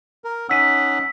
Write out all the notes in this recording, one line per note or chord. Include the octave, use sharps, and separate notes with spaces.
A#4
C#4 D#4 F#5 E6 B6 D#7